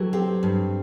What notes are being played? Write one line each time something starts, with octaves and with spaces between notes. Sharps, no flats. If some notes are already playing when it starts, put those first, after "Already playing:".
Already playing: F#3 E4 G4 A4 B4
C4 G4
G2